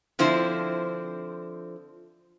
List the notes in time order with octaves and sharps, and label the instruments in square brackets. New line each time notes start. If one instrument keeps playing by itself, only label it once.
[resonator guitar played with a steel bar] D3 F3 C4 E4 C5